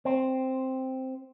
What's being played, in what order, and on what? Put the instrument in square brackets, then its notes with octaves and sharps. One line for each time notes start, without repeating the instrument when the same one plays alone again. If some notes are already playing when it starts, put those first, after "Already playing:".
[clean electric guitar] C4